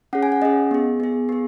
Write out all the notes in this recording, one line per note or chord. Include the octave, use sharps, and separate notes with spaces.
C#4 G#4 F#5
G#5
F#5
C#4 G#4 D#5
B3 G#4
B3 G#4
B3 G#4